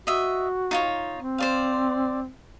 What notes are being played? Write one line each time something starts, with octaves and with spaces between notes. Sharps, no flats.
F#4 D#5 E5
D#4 F4 C#5
C4
C5 D5 F5